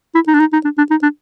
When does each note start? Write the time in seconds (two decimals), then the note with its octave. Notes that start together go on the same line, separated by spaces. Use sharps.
0.15 E4
0.27 D#4
0.34 D4
0.40 D#4
0.53 D#4
0.64 D4
0.78 D4
0.91 D#4
1.02 D4